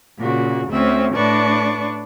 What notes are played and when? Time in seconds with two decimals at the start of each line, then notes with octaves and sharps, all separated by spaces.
0.19 A#2 C#3 F#4
0.69 D2 C4 C#4 E5
1.15 A2 D4 B4 D5 C#6